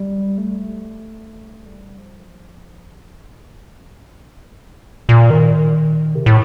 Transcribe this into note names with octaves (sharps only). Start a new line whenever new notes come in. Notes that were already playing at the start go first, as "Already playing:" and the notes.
Already playing: G3
A3
G3
F3
D3
A#2
A#2
D#3
C3
A2